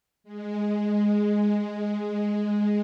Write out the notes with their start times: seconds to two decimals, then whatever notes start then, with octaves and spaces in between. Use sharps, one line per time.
0.24 G#3
1.02 G#3